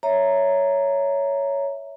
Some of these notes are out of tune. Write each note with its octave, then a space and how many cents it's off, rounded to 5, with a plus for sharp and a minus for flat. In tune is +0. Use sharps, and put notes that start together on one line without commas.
C#5 +10 E5 +0 A#5 +0